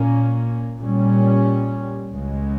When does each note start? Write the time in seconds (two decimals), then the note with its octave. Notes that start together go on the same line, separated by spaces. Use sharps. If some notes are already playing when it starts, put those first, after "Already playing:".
Already playing: A#2 A#3 C#4
0.80 A#2 G3 C#4
2.13 C#2 C#3 G#3